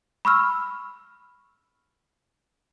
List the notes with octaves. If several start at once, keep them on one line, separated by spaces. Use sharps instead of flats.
B5 C#6 E6 F6